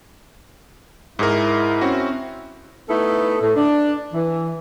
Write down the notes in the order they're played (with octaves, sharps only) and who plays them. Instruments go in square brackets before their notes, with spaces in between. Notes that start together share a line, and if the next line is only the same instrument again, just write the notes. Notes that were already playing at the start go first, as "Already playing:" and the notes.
[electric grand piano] G#2 G#4 A#4 [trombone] E4
[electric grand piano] C4 C#4 F#4
[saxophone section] A3 B3 D#4 E4 A4
A2
D4
E3